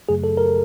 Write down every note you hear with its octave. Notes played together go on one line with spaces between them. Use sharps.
F#2 C#3 F#3 A3 G#4
A4
A#4